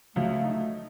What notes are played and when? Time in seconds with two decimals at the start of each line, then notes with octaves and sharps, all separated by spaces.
0.16 C#2 F#3 A3
0.44 D#4